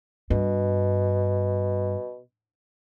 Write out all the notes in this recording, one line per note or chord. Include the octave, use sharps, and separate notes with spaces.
G2 B2